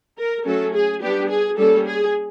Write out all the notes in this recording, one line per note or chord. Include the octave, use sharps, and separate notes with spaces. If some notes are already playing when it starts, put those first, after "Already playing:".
A#4
F#3 A3 C#4 A4
G#4
G3 B3 D4 G4
G#4
G3 A#3 C#4 A4
G#4